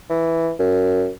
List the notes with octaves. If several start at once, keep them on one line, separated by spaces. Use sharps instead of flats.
E3
F#2